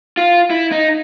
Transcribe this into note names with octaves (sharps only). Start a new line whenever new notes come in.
F4
E4
D#4